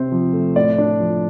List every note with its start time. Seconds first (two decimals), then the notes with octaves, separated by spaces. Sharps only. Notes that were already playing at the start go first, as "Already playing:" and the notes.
Already playing: C3 C4 C5
0.12 F3
0.33 A3
0.56 A2 D5
0.78 D4
1.00 F3